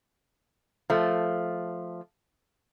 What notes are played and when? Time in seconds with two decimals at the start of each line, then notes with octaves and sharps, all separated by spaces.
0.90 F3 A3